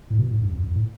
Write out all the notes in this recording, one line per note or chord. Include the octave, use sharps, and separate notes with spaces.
A2
B2
A2
G2
F2
F2
A2